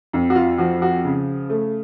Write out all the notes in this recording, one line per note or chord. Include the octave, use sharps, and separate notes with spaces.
F2
F#4
F4
F3 F#4
F#4
C#3
A3